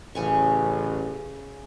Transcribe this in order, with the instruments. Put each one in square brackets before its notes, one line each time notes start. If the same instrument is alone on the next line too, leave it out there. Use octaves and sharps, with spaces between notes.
[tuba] A1 [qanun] C#3 G#5 C#6